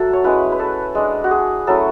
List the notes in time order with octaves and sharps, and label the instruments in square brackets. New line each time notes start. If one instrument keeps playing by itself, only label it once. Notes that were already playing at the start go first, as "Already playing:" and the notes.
Already playing: [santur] F#3 A4 E5 F#5
C#5
G#3 C#4 E4 B4
B4
A4
G#3 D4
F#4
G#4
F#3 A3 C#4 E4 A4